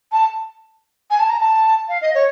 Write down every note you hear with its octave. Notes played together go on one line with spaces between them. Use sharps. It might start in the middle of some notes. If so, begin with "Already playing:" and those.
A5
G#5
A5
A#5
A5
F5
D#5
C#5